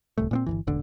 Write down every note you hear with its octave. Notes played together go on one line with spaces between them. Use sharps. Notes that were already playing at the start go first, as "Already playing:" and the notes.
D1 C2 A3
A#2 B3 C4
G1 F2 E3
E1 A1 D3